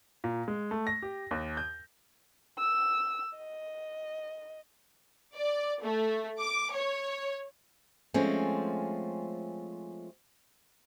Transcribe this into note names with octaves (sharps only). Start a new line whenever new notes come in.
A#2
G#3
A3
A#6
G4
D#2
G6
E6
D#5
D5
A3
D6
C#5
F3 G#3 A3 C4 C#4